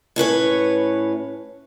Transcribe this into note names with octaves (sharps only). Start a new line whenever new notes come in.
A2 C#4 B4 C#5